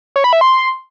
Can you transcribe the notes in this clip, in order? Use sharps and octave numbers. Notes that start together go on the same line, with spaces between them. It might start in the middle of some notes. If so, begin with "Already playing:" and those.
C#5
B5
E5
C6